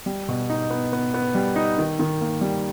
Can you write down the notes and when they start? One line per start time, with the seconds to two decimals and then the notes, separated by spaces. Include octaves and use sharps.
0.06 G3
0.28 B2
0.50 D#4
0.70 B3
0.93 B3
1.14 B3
1.35 G3
1.56 D#4
1.78 D#3
1.99 D#3
2.21 A#3
2.41 G3